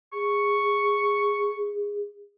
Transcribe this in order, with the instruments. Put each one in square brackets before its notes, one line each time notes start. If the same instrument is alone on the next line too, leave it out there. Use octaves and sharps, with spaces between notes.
[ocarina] G#4 [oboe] C#6